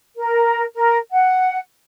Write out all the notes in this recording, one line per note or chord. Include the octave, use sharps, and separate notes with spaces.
A#4
A#4
F#5